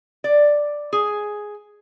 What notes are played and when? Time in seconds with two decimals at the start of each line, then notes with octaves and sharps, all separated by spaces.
0.24 D5
0.93 G#4